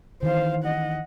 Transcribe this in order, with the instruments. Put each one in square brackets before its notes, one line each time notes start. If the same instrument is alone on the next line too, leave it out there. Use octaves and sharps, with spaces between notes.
[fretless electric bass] D#3 E3 [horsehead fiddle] C5 F5
[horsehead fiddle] D#5 F#5